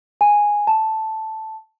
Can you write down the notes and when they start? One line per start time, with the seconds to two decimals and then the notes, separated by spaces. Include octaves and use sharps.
0.21 G#5
0.67 A5